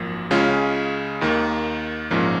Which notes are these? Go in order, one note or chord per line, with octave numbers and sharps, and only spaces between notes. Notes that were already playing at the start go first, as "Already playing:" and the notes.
Already playing: G#1 F#2 F3 A#3
C#2 C#3 G#3 C#4 F4
D#2 D#3 A#3
A#1 G#2 F3 A#3 C#4